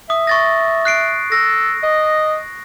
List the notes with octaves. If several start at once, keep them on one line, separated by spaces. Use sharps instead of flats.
E5 D#6
C#6 A6 A#6
F#6 C7 D7
A4 A#6
D#5